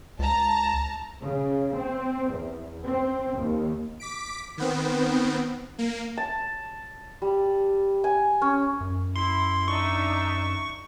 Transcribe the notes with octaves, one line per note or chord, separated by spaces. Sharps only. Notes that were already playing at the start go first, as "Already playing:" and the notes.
C#2 A5 A#5
C#3
C4
E2
C4
D#2
D6 B6 D7
D#3 B3 C4
A#3
A5
G3
G#5
C#4
F#2
E4 C6
D4 D#4 E5 C#6